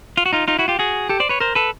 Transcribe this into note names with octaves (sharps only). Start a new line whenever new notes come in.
F4
F#4
D#4 F4
D#4 F4
E4 F#4
F4 G4
F#4 G#4
G4 A4
C5 D5
B4 C#5
A#4 C5
A4 B4